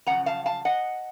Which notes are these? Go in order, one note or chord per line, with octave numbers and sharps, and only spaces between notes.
F#2 C#3 F3 F#5 A#5
F5 A5
F5 A5
D#5 F#5